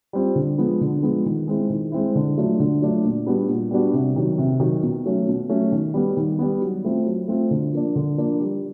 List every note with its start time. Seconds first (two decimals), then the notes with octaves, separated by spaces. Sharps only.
0.13 G3 C4 F4
0.35 D3
0.58 F3 G#3 B3
0.81 D3
1.03 F3 G#3 B3
1.26 D#3
1.48 G#3 C4 E4
1.70 D#3
1.92 G#3 C4 E4
2.15 D3
2.37 F#3 A3 D4 F4
2.60 D3
2.82 F#3 A3 D4 F4
3.04 A#2
3.26 G3 B3 D4 F#4
3.49 A#2
3.71 G3 B3 D4 F#4
3.93 C3
4.16 D#3 F#3
4.38 C3
4.60 D#3 F#3
4.83 B2
5.06 F#3 A3 C#4
5.28 B2
5.49 F#3 A3 C#4
5.72 D#3
5.94 G3 B3
6.17 D#3
6.39 G3 B3
6.61 F#3
6.84 A3 C4 F4
7.06 F#3
7.28 A3 C4 F4
7.51 D3
7.73 F3 A#3 D4
7.96 D3
8.18 F3 A#3 D4
8.40 G3